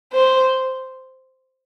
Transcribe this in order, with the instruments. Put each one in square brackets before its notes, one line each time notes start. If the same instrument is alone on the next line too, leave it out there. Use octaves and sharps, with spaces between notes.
[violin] C5